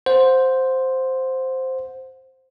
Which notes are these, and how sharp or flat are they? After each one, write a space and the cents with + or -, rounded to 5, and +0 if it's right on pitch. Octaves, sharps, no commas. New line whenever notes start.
C5 +0 F#5 -30